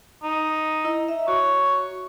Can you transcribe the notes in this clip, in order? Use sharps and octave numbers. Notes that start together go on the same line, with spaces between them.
D#4
E4 D#5 A#5
E5
F#4 C#5